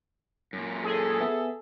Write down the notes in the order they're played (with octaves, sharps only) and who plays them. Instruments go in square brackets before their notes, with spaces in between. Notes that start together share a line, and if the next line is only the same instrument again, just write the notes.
[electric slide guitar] F#2 A#2
[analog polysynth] G#4 [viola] A4
[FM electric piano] B3 E5